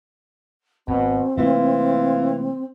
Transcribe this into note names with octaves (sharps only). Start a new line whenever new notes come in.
G#1 B2 C4
C3 E3 A3 A#3 F4